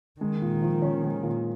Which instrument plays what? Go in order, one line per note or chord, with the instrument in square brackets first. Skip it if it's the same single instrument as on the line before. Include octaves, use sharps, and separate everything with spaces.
[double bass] D#3 [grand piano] G#3
[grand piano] A#2
F3
C#4
G#3
A#2